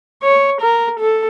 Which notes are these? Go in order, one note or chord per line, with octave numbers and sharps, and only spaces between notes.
C#5
A#4
A4